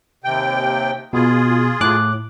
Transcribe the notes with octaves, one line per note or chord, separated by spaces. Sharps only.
D#2 C3 G5
B2 F4 G#4
A2 D6 F#6